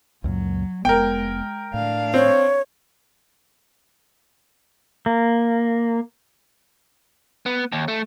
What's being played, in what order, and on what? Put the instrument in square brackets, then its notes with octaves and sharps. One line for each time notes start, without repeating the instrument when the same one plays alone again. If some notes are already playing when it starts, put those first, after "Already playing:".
[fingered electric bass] C#2 F#2 A#2 [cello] F#3
[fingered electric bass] F1 B3 [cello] G#3 [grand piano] A#4 G5
[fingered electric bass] A2 [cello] D4 F5
[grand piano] C4 [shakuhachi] C#5
[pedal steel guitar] A#3
[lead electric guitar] B3
D#2
A3